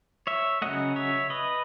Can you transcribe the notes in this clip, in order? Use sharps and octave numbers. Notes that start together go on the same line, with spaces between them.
C#5 E5
C#3 F#3 A3 D#5 F#5
C#5 E5
B4 D#5